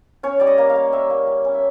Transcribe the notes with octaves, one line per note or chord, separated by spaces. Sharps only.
C#4 C#5
G3 D5
D#5
A#3
F5
A#3
G3 E5
A#3
G3
C#4
E5